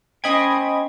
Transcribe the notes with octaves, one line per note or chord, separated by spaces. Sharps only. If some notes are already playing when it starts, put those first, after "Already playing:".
C#4 C5 D#5 G5 B5 G#6